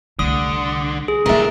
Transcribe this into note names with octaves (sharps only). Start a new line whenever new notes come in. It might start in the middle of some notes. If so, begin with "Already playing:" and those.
C2 D3 A3 D#6
G#4
C3 A#3 D4 E4 A#4 E5